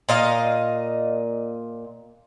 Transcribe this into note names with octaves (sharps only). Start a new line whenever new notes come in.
A#2 D#5 F5